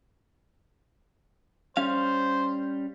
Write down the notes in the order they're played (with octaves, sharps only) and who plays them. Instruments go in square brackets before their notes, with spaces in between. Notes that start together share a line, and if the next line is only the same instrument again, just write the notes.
[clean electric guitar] G3 C#4 F5 [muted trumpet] C5